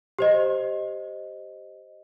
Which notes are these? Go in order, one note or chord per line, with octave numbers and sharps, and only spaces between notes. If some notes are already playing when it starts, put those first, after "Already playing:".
G4 C5 D#5